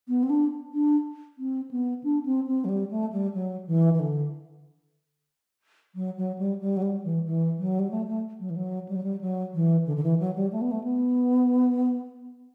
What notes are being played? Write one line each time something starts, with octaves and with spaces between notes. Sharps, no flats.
B3
C4
D4
D4
C4
B3
D4
C4
C4
F#3
G3
A3
G3
F#3
E3
E3
D3
F#3
F#3
G3
G3
F#3
G3
E3
E3
F#3
G3
A3
A3
F#3
E3
F#3
G3
F#3
G3
F#3
E3
D3
D3
E3
F#3
G3
A3
B3
A3
B3